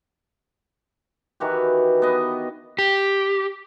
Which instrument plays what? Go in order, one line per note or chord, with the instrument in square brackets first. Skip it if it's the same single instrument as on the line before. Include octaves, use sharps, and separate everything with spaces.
[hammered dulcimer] D#3 E3 F#4 G4
B3 D#5
[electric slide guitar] G4